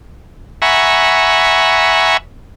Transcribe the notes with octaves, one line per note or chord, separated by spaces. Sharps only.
E5 F#5 G#5 A#5 B5 C#6